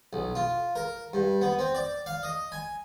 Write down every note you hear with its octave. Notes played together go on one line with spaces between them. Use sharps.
B1
F4
A#4
G2
B3
C4
D5
F5
D#5
G#5